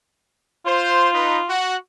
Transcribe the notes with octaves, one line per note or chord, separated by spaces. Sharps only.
F4 C5
D#4 B4
F#4 F#5